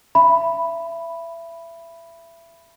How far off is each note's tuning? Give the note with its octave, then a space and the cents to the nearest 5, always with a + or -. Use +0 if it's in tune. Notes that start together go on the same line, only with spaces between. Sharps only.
E5 +25 B5 +0